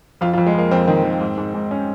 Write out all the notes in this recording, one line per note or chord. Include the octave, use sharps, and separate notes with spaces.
F2 F4
F4
F2
G#3
F2 A#3
F2 C4
D#3
D#3
G#2
G#2
G#2
C#4